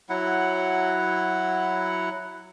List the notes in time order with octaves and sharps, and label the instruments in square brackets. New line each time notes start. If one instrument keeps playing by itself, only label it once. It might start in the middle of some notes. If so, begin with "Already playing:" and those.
[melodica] F#3 E4 F#5